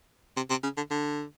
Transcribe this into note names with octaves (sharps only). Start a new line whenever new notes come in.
C3
C3
C#3
D3
D3